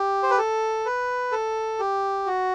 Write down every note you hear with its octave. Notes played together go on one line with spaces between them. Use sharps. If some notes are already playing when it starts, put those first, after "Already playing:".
Already playing: G4
C5
B4
A4
B4
A4
G4
F#4